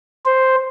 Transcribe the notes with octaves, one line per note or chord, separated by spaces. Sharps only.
C5